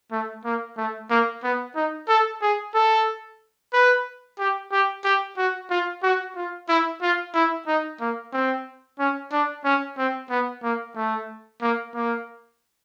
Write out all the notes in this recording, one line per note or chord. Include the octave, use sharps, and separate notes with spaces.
A3
A#3
A3
A#3
B3
D#4
A4
G#4
A4
B4
G4
G4
G4
F#4
F4
F#4
F4
E4
F4
E4
D#4
A#3
C4
C#4
D4
C#4
C4
B3
A#3
A3
A#3
A#3